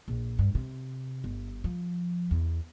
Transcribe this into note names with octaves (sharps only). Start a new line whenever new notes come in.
A#1
G2
C3
G1
F3
E2